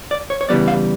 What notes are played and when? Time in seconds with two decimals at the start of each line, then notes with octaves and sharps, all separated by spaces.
0.11 D5
0.30 C#5
0.41 C#5
0.49 C#3 E3 G3 B3 D5
0.68 F5